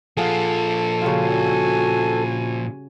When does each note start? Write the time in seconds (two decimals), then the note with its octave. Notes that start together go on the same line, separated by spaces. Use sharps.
0.17 A#2 F3 G#4 A4 F5 F#5
1.02 C#3 G3 F4 F#4 G#5